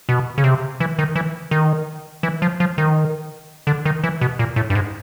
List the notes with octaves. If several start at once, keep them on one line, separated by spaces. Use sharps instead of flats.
B2
C#3
C3
E3
D#3
E3
D#3
E3
F3
F3
D#3
D3
D#3
E3
B2
A#2
A2
G2
G#2